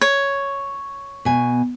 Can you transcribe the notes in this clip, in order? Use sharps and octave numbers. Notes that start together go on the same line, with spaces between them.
C#5
B2 G#5